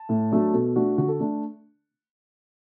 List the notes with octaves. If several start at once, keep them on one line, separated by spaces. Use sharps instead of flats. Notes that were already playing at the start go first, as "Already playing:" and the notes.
Already playing: A5
A2
F#3 A3 D4
B2 A4
A3 D4 F#4
D3 F#4
A4
A3 D4